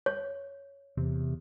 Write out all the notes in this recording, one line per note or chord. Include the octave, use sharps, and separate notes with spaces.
C#5
E2 C3